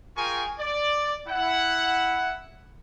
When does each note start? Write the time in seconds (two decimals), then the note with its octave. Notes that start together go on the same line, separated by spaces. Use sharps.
0.17 F4 G#4 A#4 G5 G#5 C#6
0.59 D5
1.28 E4 F#5